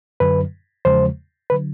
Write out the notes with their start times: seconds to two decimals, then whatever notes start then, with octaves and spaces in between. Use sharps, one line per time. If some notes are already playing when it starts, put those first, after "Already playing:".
0.20 F#2 D3 F#3 B4
0.85 E2 C#3 F3 G#3 C5
1.50 D3 F#3 B4